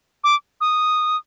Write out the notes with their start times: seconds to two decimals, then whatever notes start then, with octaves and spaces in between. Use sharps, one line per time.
0.24 D6
0.61 D#6